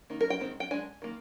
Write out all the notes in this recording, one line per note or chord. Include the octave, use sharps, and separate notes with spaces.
D#3 A#3 D#4
A#4
G5
D#3 G#3 C4
G5
G#3 D4 G#5
D#3 A#3